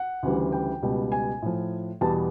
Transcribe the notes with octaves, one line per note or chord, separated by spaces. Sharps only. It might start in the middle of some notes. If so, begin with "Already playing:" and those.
Already playing: F#5
D2 C#3 E3 G3
G5
C#2 B2 G3
G#5
A2 F3
E2 B2 G3 A5